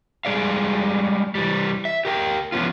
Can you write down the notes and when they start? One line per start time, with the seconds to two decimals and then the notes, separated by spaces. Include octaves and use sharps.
0.25 G3 G#3 G#4 D5 F5
1.35 E3 G3
1.85 E5
2.05 G4 A#4 G5
2.52 F3 B3 C#4 F4